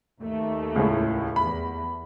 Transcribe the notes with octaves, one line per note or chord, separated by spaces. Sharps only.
D#2 A3
C#2 A2
E2 B5